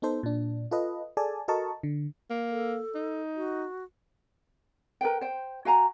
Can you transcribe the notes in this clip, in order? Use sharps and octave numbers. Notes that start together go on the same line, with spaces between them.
B3 D#4 A4 C5
A#2 D4
F4 A4 B4 D#5
G#4 A4 D5 G#5 A5
F#4 A4 A#4 D#5 A5 C#6
D3
A#3
A4
D#4
F#4
A#4 B4 G5
C5 G5
F#4 F5 G#5 A#5